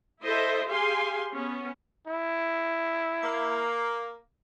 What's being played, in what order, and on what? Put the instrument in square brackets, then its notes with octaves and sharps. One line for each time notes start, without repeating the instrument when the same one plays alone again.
[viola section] E4 A4 C5 D#5 E5
G4 G#4 F5 G#5 C6
B3 C#4
[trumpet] E4
[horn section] A#3